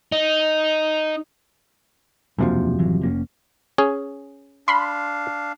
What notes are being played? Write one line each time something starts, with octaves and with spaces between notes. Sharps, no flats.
D#4
E1 F#2 C3 F3 A#3 D4
A1 E3 F#3
F1 A#3 C#4
C#4 G#4
D4 F5 B5 C6